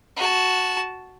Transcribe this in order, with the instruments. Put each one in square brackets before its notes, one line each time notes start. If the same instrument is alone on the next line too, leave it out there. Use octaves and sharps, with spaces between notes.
[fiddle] F#4 A5